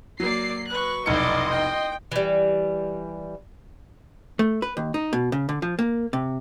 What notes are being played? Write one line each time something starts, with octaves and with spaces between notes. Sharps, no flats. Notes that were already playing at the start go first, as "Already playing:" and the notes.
F#3 A#3 D5 C7
B4 C#6 F#6
F1 B1 E4 D5 D#5 C6 C#7
G5
E3 G3
A3
B4
D#2
D#4
B2
C#3
D3
F3
A#3
C3